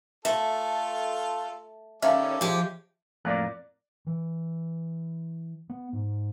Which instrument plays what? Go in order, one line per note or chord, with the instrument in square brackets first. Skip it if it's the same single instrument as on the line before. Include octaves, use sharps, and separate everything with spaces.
[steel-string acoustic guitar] A3 [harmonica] F4 A4 [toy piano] E5
[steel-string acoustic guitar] D#3 [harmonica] G3 A4 D5 [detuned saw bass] C#4 [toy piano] E5 F5 A5
[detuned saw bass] F3 [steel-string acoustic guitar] G#3 G4 [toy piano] C#5
[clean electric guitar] F2 A2 A#3 [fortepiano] D5 F#6
[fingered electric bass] E3
B3
G#2